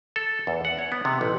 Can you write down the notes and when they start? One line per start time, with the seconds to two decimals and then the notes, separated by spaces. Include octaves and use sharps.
0.16 A4
0.47 E2
0.65 F#5
0.79 C#5
0.92 B3
1.05 C3
1.21 A1